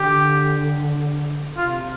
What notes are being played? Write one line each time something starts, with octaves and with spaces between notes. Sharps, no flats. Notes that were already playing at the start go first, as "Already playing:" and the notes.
Already playing: D3 G4
C3 F4